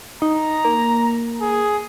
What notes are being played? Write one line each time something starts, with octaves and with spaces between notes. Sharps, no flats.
D#4 A#5
A#3
G#4